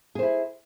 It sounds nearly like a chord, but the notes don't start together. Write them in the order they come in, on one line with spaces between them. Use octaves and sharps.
G#4 C5 E4